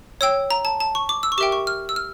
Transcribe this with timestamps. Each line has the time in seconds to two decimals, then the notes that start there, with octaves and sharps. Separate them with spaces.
0.21 C#5 G5 E6
0.51 A#5
0.65 A5
0.80 A5
0.95 C#6
1.09 D6
1.23 E6
1.32 C#6
1.38 G4 A#4 E5 G5 D6
1.52 C#6
1.67 F6
1.89 E6
1.96 F6